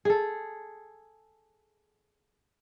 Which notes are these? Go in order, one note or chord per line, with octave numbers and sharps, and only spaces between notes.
G#4 A4